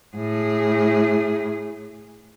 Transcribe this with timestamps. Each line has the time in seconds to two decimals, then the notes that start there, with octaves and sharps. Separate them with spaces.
0.16 A2 G#4